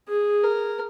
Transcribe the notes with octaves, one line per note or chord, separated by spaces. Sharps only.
G#4
A#4